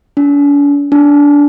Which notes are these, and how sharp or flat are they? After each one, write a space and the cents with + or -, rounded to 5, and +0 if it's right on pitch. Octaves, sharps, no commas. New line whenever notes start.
D4 -45
D4 -20